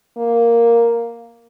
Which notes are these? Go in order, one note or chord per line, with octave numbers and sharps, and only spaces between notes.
A#3